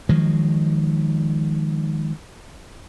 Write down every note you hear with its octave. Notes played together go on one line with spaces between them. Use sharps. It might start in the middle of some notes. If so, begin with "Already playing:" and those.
D#3 F3 F#3 G#3